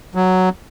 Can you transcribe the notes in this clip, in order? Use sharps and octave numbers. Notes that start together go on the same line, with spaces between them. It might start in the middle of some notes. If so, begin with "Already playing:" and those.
F#3